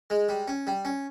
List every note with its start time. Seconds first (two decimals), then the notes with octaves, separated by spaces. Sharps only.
0.10 G#3
0.29 G3
0.48 C#4
0.67 G3
0.85 C#4